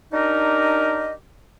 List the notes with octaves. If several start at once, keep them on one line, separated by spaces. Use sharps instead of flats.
D4 D#4 G4 A#4 D#5